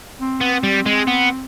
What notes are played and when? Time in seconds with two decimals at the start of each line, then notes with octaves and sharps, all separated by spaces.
0.20 C4
0.41 B3
0.63 G3
0.86 G#3
1.08 B3